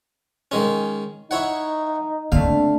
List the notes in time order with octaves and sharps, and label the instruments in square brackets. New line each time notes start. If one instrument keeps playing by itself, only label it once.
[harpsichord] D#3 G#3 C#4
[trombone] D#4 [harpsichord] E4 C#5 F#5
[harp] D3 A3 [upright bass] A#3 C4 [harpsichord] F5